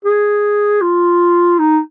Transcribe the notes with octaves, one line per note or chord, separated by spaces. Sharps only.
G#4
F4
D#4